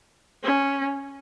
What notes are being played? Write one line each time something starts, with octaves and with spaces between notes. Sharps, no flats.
C#4